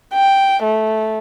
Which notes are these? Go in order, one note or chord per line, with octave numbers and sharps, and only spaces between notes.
G5
A3